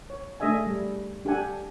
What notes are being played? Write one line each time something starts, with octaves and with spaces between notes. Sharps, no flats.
C#5
A3 D4 G#4 D#5 E5 G#5
G3
D4 G4 A4 F#5 G#5